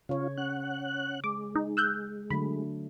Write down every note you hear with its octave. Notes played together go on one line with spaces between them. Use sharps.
C#3 C#4 F4 C#5
C#4 F#5 F#6
G#3 D6
D#4
E6 F#6 G6
D3 F#3 A3 B5